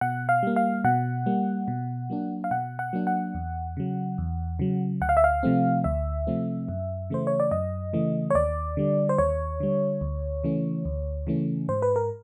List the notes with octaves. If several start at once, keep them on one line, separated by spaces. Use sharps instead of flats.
B2 F#5
F5
G3 A#3
F5
B2 F#5
G3 A#3
B2
F#3 A#3 D4
F5
B2 F#5
F#5
F#3 A#3 D4
F#5
E2
C#3 F#3
E2
C#3 F#3
D2 F#5
F5
E5
F5
C3 F3 A3 C4
D2 E5
C3 F3 A3 C4
F#2
C#3 E3 A3 C5
C#5
D5
F#2 D#5
C#3 E3 A3
C#5
D#2 D5
D3 G3
C5
D#2 C#5
D3 G3
D2
C#3 E3 A3 C#4
D2
C#3 E3 A3 C#4
G#2 C5
B4
A#4